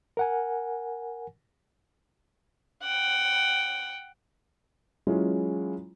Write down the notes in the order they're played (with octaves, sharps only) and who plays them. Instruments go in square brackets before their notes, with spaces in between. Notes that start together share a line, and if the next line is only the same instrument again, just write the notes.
[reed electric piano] A#4 F#5 G#5
[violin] F#5 G5
[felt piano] E3 F#3 G#3 C#4 E4 F4